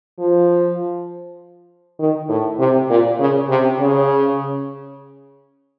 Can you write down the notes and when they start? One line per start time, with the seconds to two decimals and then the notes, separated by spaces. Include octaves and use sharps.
0.19 F3
2.00 D#3
2.29 A2
2.59 C3
2.90 A#2
3.20 C#3
3.49 C3
3.80 C#3